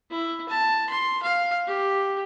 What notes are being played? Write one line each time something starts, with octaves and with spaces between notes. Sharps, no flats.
E4
A5
C6
F5
G4